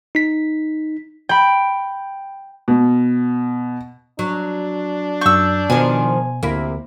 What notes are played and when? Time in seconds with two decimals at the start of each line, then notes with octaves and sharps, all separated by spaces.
0.15 D#4 B6
1.29 G5 B5
2.68 B2
4.19 F#3 D4
5.21 F#2 C#6 E6 G6
5.70 B2 D#3 F3 G#5
6.43 D2 C3 A#3 E4